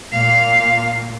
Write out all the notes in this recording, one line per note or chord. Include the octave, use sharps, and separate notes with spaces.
A#2 F5